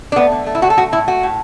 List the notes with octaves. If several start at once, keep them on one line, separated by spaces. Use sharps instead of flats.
D4
A3 B3
D3
A3
E4
D3 F#4
A4
A3 F#4
A2 E4
A3 F#4
A2